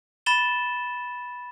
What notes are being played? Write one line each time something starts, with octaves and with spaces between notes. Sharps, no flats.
B5 A6 E7 G7